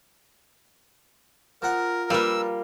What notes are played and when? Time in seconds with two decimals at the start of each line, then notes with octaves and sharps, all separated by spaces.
1.62 F3 A#4 F#5
2.10 G3 A#3 D4 F4 A#4 B4 F5 E6